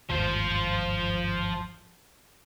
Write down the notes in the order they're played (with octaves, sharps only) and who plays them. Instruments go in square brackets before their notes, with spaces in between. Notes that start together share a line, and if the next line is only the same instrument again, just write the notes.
[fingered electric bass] G1 D#2 G#2 [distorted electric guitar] F3 C5